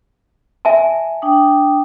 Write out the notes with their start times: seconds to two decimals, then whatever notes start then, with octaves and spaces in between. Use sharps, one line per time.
0.65 E5 G#5 A5
1.22 D4 G5 D#6